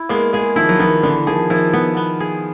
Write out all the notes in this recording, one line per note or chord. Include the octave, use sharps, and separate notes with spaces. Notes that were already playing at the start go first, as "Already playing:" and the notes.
Already playing: E4
G#3 A#3 B3
G#3 A#3 G#4
D#3 F3 E4
F#3
D#3 F3 B3
D3 E3 B3
D#3 F3 G#4
D#3 F3 E4
B3
B3
G#4